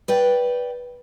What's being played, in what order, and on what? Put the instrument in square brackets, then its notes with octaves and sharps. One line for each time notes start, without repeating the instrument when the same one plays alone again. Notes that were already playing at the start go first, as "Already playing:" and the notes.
[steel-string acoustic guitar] B4 D5 G5